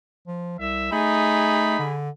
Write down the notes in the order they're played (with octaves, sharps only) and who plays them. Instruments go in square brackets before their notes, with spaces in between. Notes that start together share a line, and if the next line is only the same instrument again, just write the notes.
[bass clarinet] F3
[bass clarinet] C2 [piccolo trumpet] E5
[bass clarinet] A3 [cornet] D#4 [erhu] G#4 [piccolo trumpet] B5
[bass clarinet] D3